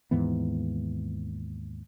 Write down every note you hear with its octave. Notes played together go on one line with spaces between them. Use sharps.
D#2 G#2 E3 B3